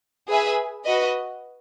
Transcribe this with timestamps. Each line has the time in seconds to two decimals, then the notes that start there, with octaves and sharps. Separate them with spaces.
0.28 G#4 B4 E5 G#5
0.85 F#4 B4 D#5